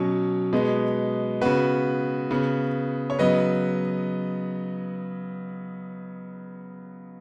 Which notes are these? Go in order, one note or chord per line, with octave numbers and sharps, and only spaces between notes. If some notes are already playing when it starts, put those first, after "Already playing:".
Already playing: B2 F#3 C#4
B2 G#3 B3
C#3 B3 F#4 B4
C#3 B3
C#5
C#3 F#3 B3 B4 D#5